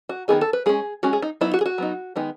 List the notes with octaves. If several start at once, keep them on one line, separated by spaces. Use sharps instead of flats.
F#4
D#3 F#3 B3 D#4 G#4
A4
B4
G#3 C#4 G#4
G#3 C#4 F#4
G#4
D#4
F#3 B3 D#4 E4
F#4
G#4
F#4
F#3 B3 D#4
D#3 G#3 B3 D#4